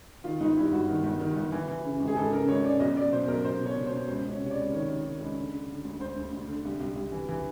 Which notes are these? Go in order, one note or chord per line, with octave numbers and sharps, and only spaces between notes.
D#3 F4
G1 D#4
G2 E4
G1 F#4
D#3
G1
D#3
G1
E3
E3
C#3
G#1
G#4
G#1 A4
C#3 A#4
G#1 C#5
C#3 D5
B1 D#5
B1 D5
B2 C5
B1 A#4
B1 C5
B2
C#5
B2
C5
B2
C#2 C5
C#2 C#5
C3
C#5
D5
C#2
D#3 C#5
D#3
D#3
C#2
D3
D3
D3
D2
D2 C5
D2
D2
D3
C2
C2
C2
E3
E3